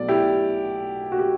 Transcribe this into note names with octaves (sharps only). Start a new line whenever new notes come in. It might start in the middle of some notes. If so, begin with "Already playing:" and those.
Already playing: B1 B2 A3 D5
E4 G4
F#4
G4